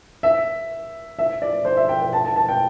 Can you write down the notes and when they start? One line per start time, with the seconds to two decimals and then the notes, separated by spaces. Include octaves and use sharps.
0.23 E5
1.19 E5
1.42 D5
1.65 C5
1.77 E5
1.89 G5
2.00 G5
2.13 A5
2.25 A5
2.36 A5
2.49 G5